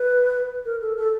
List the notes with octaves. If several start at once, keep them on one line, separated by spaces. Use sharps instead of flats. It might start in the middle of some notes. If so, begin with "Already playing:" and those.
Already playing: B4
A#4
A4
A4